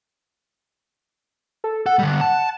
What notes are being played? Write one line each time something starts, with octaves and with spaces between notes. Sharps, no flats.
A4
A4 F#5
D3 G3
A5